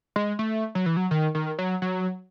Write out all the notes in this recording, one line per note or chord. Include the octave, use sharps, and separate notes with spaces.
G#3
A3
F#3
E3
F#3
D#3
D#3
F#3
F#3